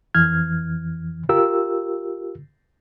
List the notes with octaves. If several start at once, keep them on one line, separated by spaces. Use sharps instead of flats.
F2 E3 F6 G#6
F4 G4 A#4 E6